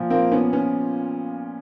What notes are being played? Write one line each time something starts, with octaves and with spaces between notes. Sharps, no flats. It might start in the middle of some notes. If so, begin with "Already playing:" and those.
Already playing: A#2 F3
A#3 C4
B3 C#4
B3 C#4